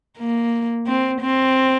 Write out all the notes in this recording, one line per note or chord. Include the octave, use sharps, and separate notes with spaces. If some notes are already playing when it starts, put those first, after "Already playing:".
A#3
C4
C4